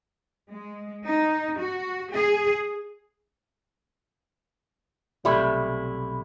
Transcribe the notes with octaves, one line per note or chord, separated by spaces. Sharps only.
G#3
D#4
F#4
G#4
B1 C3 G3 A3 E4